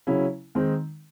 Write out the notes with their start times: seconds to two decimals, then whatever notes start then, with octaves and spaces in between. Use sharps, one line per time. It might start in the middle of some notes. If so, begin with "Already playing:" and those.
0.07 C#3 F#3 C#4 E4
0.55 D#3 G#3 C4 D#4